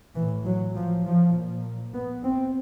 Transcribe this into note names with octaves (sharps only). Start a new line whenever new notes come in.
A2 E3
F#3
F3
F3
A#2
B3
C4